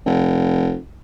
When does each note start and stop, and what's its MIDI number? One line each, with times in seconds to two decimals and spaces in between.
0.06 0.77 29